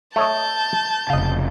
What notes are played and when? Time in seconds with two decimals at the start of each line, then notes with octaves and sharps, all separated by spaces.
0.16 A3 C#5 D#5 A5 G6
1.10 F1 C#3 D#5 F5